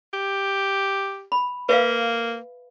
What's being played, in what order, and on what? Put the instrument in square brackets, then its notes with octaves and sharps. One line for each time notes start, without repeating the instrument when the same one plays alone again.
[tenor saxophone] G4
[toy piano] B5
[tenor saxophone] A#3 [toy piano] B4 E5 F5